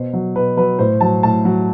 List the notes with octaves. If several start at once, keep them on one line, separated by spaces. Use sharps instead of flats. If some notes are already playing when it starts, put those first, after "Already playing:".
Already playing: B2 C5
F#3
B2 B4
F#3 B4
A2 C5
F#3 A5
A2 A5
F#3